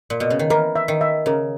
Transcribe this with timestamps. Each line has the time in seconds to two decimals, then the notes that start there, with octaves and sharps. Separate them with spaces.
0.10 A#2
0.20 B2
0.30 C#3
0.39 D#3
0.50 E3 A#4
0.76 E5
0.88 D#3
1.01 E5
1.26 C#3 A#4